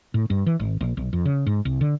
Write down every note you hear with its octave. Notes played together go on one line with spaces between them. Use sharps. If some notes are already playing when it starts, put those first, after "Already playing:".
A2
G2
E3
G#1
A#1
B1
F2
C#3
G#2
C2
D3